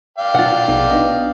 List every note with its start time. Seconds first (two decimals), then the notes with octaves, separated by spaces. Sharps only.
0.18 D5 F5 G5
0.34 B2 F4 F#5
0.68 A#1 B3 D#4
0.91 B3 D4 D#5